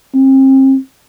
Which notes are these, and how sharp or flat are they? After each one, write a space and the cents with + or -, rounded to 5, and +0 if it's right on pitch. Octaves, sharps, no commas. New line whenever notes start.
C4 +35